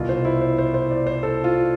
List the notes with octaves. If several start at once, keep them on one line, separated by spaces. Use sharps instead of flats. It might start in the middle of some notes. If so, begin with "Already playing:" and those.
Already playing: C2 B2 F4
C5
E4
C5
C5
C5
D5
C5
A4
F4